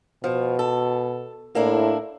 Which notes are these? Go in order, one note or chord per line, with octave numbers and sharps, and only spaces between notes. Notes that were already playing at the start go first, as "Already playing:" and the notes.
B2 F3
A4
A2 A#3 D4 E4